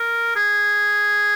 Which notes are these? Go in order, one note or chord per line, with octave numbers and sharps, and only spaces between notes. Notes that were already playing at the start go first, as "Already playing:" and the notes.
Already playing: A#4
G#4